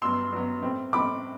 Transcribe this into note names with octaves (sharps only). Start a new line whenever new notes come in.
G2 F#3 B3 C6 E6
G2 F#3 B3
A2 G3 C4
A2 G3 C4 B5 D6